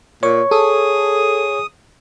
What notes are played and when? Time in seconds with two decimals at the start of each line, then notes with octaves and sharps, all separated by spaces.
0.23 A#2 C#5 C#6
0.51 G#4 A4 D#6